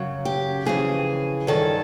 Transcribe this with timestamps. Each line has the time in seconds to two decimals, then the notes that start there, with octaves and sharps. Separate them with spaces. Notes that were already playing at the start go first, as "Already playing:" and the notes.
Already playing: F#2 C#3 F#3
0.25 G4
0.65 F2 C#3 E3 G#4
1.47 G2 D#3 F#3 A4